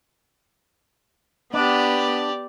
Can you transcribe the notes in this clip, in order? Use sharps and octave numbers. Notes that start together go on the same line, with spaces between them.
B3 D4 G4 D5